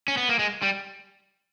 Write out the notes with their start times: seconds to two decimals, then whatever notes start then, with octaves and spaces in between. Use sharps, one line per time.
0.08 C#4
0.17 B3
0.29 A#3
0.39 G#3
0.62 G3